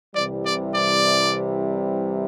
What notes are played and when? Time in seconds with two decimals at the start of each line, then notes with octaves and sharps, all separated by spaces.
0.14 C2 C3 E3 G3 D5
0.44 D5
0.73 D5